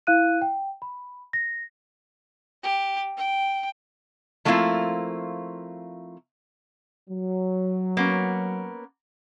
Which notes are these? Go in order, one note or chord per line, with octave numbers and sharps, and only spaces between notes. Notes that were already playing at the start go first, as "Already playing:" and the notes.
E4 F5 F#6 D#7
G5
B5
A#6
G4
G5
F3 A3 A#3 C4 E4 F4
F#3
A#3 B3 C#4